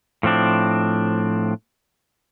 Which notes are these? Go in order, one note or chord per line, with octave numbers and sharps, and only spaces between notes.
A2 F3 C4 D4